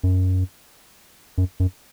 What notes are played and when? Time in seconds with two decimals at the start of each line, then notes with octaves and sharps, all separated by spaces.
0.03 F#2
1.38 F#2
1.60 F#2